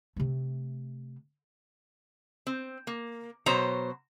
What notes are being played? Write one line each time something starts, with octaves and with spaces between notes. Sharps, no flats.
C3 A3
C4
A#3
B2 F#3 C5 C#5 A#5